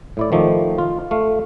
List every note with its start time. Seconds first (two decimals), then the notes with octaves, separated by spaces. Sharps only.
0.17 A2 E4 D5
0.32 D#3 F3 A3 D#4
0.78 F4
1.11 A3 F5